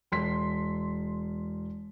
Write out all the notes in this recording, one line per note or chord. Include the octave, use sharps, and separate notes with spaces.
E1 C6 B6